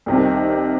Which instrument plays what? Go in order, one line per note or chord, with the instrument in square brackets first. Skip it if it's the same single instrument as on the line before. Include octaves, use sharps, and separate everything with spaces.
[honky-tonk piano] C2 C3 D#3